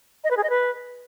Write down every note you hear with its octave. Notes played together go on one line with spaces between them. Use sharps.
D#5
B4
G#4
D#5
B4